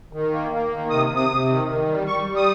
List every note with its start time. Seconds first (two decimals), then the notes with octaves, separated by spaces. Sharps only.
0.13 D#3
0.31 A#3
0.52 A#3
0.71 D#3
0.90 C3 D#6
1.10 C3
1.16 D#6
1.29 C3
1.49 D#3
1.67 D#3
1.88 G3
2.07 G3 C#6
2.27 G3
2.36 D#6